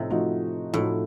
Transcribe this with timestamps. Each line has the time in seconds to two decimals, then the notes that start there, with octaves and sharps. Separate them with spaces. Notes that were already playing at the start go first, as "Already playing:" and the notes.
Already playing: A2 C3 F3 A3 D#4
0.10 F3 A3 D#4 F#4
0.73 A2 F3 A3 D#4 F#4